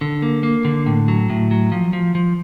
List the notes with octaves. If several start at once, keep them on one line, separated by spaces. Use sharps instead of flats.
D3
A#3
A#3
D3
A2
F#3
A2
F#3
F3
F3
F3